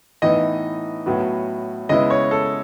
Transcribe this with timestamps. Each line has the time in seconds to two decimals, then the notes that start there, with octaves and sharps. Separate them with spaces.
0.22 A2 E3 B3 D#4 D#5
1.06 A2 F#3 B3
1.89 C#3 G#3 B3 E4 D#5
2.10 C#5
2.31 A4